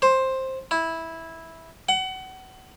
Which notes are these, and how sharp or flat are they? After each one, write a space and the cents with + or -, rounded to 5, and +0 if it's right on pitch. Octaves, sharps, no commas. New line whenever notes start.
C5 +10
E4 -10
F#5 +30